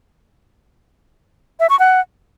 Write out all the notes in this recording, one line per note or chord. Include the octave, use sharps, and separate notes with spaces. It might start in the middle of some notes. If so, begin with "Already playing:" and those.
E5
C#6
F#5